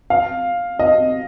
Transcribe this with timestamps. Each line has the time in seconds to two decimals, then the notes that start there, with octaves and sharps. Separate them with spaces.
0.10 F5
0.79 D#5